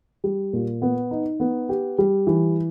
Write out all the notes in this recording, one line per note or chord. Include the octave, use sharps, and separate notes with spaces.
G3
A#2
B3
D#4
B3
G4
G3
E3